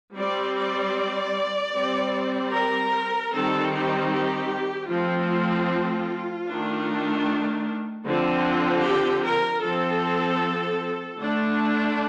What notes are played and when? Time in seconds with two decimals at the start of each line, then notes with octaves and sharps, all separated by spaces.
0.17 G3 C4 D5
0.56 D5
1.75 G3 C4
2.53 A#4
3.32 D#3 G3 C4 A4
3.71 G4
4.11 G4
4.89 F3 A3 C4 F4
6.47 D#3 A3 D4
8.05 D3 F3 C4
8.83 G4
9.23 A#4
9.62 F3 C4 A4
11.20 D3 A3 D4